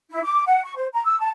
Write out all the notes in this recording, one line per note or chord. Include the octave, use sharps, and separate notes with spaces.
E4
D6
F#5
C#6
C5
A#5
E6
A5